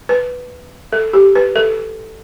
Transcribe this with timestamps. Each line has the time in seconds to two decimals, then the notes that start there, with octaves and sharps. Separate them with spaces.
0.09 B4
0.92 A4
1.13 G4
1.35 B4
1.56 A4